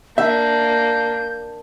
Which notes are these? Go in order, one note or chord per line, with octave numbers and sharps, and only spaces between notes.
A#3 D4 E5 G6